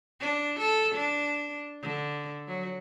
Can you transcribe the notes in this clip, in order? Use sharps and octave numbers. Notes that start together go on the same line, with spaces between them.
D4
A4
D4
D3
F#3